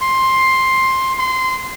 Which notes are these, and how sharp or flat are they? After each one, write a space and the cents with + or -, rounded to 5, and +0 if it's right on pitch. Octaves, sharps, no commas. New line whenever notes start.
C6 +10
C6 -20